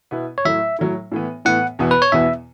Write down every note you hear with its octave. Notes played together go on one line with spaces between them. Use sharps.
B2 B3 E4
C#5
A2 F#3 A3 E4 E5
A2 F#3 A3 E4
A2 E3 B3
A2 E3 B3 F#5
E2 B2 B3 E4
B4
C#5
E2 B2 B3 E4 E5